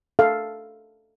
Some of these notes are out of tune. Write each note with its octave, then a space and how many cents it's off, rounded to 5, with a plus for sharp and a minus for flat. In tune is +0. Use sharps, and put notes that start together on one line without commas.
A4 +0 F5 +0